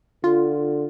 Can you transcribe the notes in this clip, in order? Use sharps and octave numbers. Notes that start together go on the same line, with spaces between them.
D3 F4